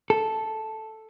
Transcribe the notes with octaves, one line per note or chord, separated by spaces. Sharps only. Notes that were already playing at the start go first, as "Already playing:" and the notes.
A4